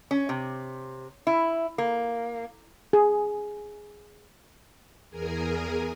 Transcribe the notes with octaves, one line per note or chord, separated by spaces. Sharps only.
C#4
C3
E4
A#3
G#4
E2 G#4 A#4 G#5